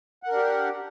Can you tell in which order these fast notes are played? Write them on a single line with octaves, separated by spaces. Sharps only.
F#5 A#4 D4 G4